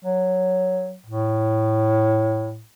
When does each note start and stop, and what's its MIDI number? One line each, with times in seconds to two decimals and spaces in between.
0.04 0.98 54
1.06 2.63 45